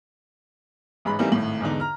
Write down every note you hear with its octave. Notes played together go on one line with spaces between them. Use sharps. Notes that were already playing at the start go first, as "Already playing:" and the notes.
A1 G#2 G#3 B5
E3 G3 A3 A#3 C4 D#4
G#1 A2
E2 G#2 D3 D#4
A#5 F6